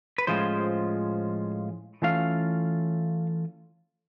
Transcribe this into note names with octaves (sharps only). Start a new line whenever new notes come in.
B4
A2 F3 G#3 C#4 F4 C5
E3 A3 C#4 F4 F5